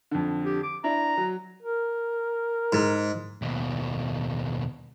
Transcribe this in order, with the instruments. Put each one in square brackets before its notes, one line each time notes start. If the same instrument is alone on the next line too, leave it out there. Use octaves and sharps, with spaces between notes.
[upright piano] F2 D3
[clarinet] G4
D6
[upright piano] D4 E4 [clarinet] A#5
[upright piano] F#3
[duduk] A#4
[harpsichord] G#2
[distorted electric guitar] D#2 B2